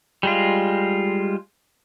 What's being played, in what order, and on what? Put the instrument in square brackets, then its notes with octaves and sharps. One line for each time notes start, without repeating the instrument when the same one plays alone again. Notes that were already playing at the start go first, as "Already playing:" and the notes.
[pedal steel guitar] G3 G#3 F4